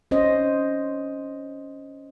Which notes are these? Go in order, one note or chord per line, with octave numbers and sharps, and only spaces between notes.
C#4 C5 D#5